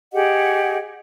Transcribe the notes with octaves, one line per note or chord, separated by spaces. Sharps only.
G4 G#4 D#5 F#5